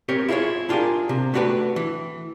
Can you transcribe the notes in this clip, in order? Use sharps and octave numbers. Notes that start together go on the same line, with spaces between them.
C4 G4 A#4 C#5
E4 F4 G#4 A4 C#5
D4 F4 G4 G#4 A#4
C3
A3 D4 F#4 G4 B4
E3